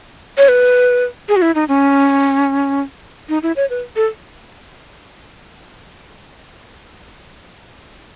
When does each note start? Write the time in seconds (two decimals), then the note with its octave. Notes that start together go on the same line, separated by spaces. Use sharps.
0.38 C#5
0.48 B4
1.29 G#4
1.36 F#4
1.42 E4
1.55 D#4
1.69 C#4
3.29 D#4
3.43 E4
3.56 C#5
3.70 B4
3.96 A4